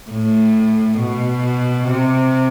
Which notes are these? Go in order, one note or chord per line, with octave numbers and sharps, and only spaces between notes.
A2
B2
C3